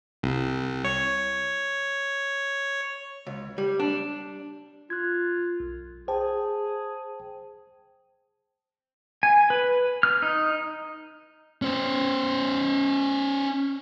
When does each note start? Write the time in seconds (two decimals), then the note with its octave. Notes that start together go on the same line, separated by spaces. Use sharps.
0.23 C2
0.84 C#5
3.27 C#2
3.58 G3
3.80 D4
4.90 F4 F#6 G#6
5.60 B1
6.08 G#4 C5 G5 A5
9.23 G#5
9.50 B4
10.03 F6
10.22 D#4
11.62 C#4 C5